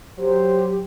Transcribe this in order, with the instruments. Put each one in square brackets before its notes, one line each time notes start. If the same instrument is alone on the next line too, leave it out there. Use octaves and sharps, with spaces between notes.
[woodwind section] F#3 [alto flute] G4 [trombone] C5